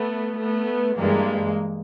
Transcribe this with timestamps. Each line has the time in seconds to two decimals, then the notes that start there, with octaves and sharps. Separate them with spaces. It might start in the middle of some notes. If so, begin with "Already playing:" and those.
Already playing: A3 B3
0.39 A3 B3
0.96 G2 E3 G#3 A#3